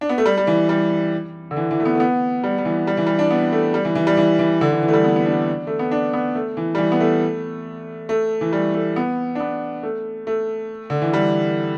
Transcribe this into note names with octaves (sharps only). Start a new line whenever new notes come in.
D4
B3
A3
G3
G3
E3
G3
D3
E3
E3
A3
B3
A3
B3
G3
G3
E3
G3
E3
G3
D4
B3
A3
G3
E3
E3
G3
E3
E3
D3
E3
E3
A3
G3
B3
B3
D4
A3
B3
D4
B3
A3
E3
G3
E3
B3
A3
A3
E3
G3
A3
B3
D4
B3
A3
A3
D3
E3
G3